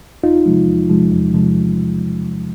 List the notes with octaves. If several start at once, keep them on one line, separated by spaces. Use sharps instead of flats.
E2 D#4 F4
C3 F3 G#3
E2
C3 F3 G#3
E2
C3 F3 G#3